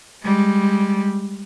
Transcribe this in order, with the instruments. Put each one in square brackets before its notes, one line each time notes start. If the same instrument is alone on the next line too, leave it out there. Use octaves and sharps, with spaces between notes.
[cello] G3 G#3